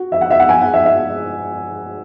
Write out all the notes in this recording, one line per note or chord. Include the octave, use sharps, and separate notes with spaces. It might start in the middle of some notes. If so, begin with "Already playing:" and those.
Already playing: F#4
E5
F#5
E5
F#5
G#5
F#5
E5
E5